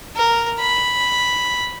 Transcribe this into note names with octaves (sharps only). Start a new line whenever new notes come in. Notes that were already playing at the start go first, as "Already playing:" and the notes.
A#4
B5